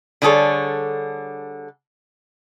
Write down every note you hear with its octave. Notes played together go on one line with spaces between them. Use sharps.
D3 G3 G#4 A4 C#5